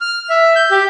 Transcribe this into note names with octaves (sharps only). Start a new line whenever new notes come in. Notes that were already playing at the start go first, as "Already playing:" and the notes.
F6
E5
G6
G4